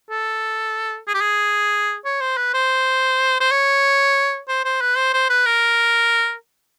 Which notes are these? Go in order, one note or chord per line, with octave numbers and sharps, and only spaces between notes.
A4
G#4
G4
G#4
C#5
C5
B4
C5
C5
C#5
C5
C5
B4
C5
C5
B4
A#4